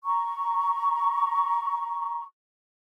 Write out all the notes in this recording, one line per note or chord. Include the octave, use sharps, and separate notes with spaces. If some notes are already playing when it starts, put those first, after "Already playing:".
A#5 C#6